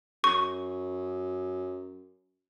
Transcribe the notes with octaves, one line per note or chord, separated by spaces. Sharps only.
F#2 C#6